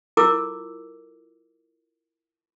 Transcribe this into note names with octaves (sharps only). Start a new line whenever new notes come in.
E4 F4 A4 A#4 D6 E6